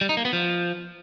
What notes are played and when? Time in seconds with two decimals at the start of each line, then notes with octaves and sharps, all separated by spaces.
0.01 G3
0.09 D#4
0.17 A#3
0.25 B3
0.33 F3